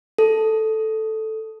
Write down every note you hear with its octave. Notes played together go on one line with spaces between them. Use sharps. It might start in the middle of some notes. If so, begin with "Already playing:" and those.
A4